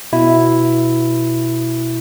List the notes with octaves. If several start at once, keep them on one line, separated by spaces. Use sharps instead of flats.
B2 E4